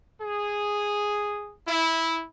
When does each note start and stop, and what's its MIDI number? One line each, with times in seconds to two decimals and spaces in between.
0.21 1.54 68
1.67 2.26 64